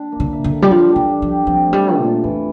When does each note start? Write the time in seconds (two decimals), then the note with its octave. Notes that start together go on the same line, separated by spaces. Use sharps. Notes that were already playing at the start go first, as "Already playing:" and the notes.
Already playing: D4
0.12 A#3
0.20 D3
0.33 E5
0.44 D3
0.51 A4
0.62 G3
0.71 F3 D4
0.89 G3
0.96 E3
1.09 G3
1.22 F3
1.28 G4
1.47 F3 C4
1.67 A3
1.73 G3
1.85 A4
1.98 A#2
2.04 F4
2.24 F2 E3